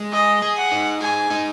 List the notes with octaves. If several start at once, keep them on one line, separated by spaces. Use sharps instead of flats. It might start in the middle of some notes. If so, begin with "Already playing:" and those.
Already playing: G#3
G#4 D#5
G#4
F#5
D#4
G#4 G#5
D#4